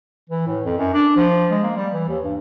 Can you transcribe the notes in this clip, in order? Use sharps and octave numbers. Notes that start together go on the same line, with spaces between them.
E3
A2
F2
F#2
D4
F3
G#3
A#3
G3
E3
D#2
G2